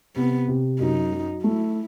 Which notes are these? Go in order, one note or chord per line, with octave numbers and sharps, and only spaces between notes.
C3 B3
C3
F#2 D#4
F#3
A3 E4